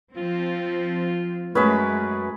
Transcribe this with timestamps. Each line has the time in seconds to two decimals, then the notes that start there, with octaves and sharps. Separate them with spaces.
0.17 F3 C4 F4
1.55 F#2 G#3 A3 C#4 G#4 B4 B5